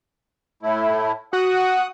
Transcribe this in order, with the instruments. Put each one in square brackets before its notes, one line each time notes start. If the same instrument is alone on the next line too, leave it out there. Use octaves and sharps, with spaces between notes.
[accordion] A2 A3 E4
[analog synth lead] F#4 [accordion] F#5 D#6 F#6